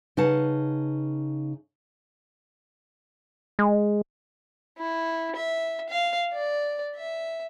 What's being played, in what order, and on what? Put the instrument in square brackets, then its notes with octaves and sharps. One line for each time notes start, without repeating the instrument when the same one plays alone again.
[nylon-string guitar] C#3 D#4 B4 F#5 A5
[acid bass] G#3
[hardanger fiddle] E4
E5
F5
D5
E5